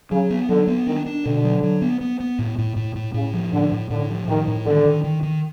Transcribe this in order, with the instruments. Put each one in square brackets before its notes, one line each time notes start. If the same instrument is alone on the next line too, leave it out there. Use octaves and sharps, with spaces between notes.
[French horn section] C#3 [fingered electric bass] F#3
[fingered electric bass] B3
[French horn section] D3 [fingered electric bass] F#3
[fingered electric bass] B3
[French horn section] D#3 [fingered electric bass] D4
[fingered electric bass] D4
[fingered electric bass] B2 [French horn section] D3
[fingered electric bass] F#3
F#3
B3
B3
B3
A2
A2
A2
A2
[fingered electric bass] A2 [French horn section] C#3
[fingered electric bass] F3
[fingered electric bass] A2 [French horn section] D3
[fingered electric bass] A2
[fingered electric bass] A2 [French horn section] D3
[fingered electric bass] F3
[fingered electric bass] A2 [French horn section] D#3
[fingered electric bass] A2
[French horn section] D3 [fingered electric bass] D#3
[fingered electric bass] D#3
D#3
D#3